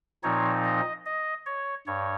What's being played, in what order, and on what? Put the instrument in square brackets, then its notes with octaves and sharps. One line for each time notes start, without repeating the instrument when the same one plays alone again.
[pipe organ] A#2 F3 C4 D#4 C#5
D#5
D#5
C#5
G2 C#5